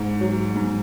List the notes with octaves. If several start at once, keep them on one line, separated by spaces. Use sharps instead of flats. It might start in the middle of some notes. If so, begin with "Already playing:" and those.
Already playing: G#2
F#3
G#2